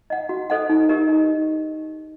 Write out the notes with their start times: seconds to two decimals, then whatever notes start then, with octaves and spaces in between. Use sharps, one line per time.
0.10 D#5 F#5
0.29 F#4
0.50 A4 C5 D#5 F#5
0.69 D#4
0.89 G4 A#4 D#5
1.09 D#4